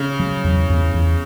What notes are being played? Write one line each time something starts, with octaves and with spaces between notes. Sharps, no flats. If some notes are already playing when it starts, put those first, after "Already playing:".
Already playing: C#3
F#3
E2
E2
E2